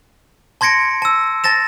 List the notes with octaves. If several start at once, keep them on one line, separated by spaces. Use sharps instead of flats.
A5 C6 G#6 A#6 C#7 D7
A5 E6
A5 A6 A#6 E7